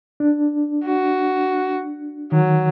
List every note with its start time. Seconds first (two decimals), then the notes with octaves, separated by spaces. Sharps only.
0.20 D4
0.84 F#4
2.32 D#3 F#3